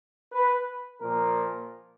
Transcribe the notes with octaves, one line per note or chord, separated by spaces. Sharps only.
B4
A#2 F3 A#4